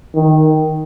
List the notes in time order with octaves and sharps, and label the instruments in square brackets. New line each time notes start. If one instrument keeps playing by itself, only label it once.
[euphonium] D#3